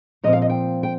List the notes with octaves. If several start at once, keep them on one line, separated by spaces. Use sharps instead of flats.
A#2 F3 C4 D#5
F5
D#5
G5
G5